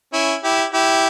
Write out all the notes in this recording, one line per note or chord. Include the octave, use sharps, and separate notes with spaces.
C#4 E4
E4 G4
E4 G4